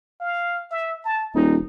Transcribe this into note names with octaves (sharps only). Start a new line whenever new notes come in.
F5
E5
A5
D#1 D#4